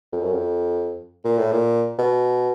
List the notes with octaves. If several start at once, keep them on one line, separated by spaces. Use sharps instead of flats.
F2
F#2
F2
A#2
A2
A#2
B2